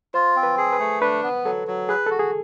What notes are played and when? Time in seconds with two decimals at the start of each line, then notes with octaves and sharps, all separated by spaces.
0.14 F4 C5
0.36 C4
0.43 B4
0.58 G#4
0.73 B4
0.80 A3
1.01 D4 B4
1.23 B3
1.45 F#3 A4
1.68 F#3
1.89 G#4 B4
2.06 F#4 A4
2.19 G#4